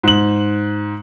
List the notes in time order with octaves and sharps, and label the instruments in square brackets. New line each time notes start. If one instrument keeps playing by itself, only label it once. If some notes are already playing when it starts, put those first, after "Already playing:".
[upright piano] G#2 F#7